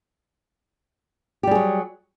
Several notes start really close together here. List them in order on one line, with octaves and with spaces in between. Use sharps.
G4 G3 G#4 F#3